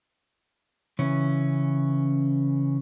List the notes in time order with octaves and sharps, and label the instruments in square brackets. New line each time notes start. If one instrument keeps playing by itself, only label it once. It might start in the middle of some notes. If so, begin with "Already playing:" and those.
[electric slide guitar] C#3 E3 C#4